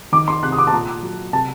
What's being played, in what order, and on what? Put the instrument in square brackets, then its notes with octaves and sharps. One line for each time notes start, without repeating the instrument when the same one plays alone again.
[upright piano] D#3 D6
C6
C3 F#6
D#6
D6
A5
A#2 A#5
F#3
C3 A5